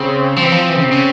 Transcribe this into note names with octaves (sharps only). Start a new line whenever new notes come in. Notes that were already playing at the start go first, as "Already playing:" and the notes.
Already playing: C#3 C4
F3 C4
E3
F3
E3
C#3
C3
C#3